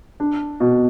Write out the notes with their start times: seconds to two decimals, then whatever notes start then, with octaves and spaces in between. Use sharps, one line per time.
0.20 D4
0.60 B2